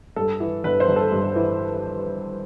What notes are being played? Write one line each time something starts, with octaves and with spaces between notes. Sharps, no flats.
G2 A4
E3
G1 B4
C5
G1
A4
G2
E3